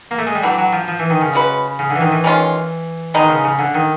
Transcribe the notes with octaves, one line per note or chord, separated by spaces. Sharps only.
A#3
A3
G#3
G3
E3 F#3 A3 D4 G4
F#3
F3
F3
E3
D#3
C#3
G#3 C#4 F#4 B4
C#3
D3
E3
D#3
E3
D#3 G#3 C#4 F4
D#3 G#3 B3 D#4
C#3
C#3
D3
D#3